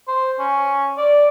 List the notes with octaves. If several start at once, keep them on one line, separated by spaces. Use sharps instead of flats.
C5
C#4
D5